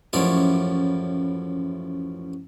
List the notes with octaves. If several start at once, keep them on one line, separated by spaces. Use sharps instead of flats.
A1 F#2 F3 E4 C#5 D5